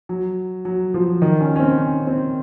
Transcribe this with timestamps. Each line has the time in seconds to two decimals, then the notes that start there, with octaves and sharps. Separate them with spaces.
0.09 F#3
0.65 F#3
0.94 F3
1.22 D#3
1.41 C#4
1.56 C#4
1.59 C4
1.78 C#4
2.07 C4